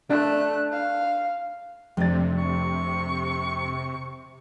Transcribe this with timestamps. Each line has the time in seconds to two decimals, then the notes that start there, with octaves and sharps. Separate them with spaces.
0.10 A3 D4 F#6
0.73 F5
1.97 F1 F2 C3 D4 A6
2.38 C#6